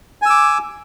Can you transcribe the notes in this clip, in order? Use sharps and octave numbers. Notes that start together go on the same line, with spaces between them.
G#5 D6 E6